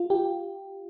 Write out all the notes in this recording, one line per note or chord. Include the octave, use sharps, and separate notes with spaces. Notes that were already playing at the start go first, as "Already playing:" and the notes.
Already playing: F4
G4